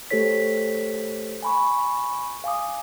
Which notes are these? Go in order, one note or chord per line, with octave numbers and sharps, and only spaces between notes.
A3 G4 A4 C5 C#5 B6
G#5 B5 C#6
F5 G#5 D6 D#6